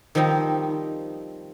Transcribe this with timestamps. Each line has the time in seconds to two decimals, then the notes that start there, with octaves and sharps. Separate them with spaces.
0.15 D#3 F3 G3 C4 D#4